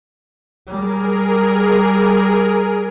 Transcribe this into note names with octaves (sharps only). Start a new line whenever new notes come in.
G3 G#4 A#4